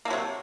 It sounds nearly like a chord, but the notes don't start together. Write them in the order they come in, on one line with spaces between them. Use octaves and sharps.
A#3 A3 F#3 C3